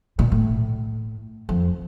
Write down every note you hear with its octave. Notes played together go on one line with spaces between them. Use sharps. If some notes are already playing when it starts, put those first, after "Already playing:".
A#2
A2
F2